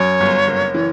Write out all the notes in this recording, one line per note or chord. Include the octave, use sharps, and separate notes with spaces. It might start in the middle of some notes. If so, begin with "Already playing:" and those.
Already playing: F#2 C#5
G1
F#1
E3